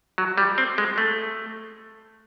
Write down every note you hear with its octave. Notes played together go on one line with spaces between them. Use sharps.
F#3
G3
C4
G#3
A3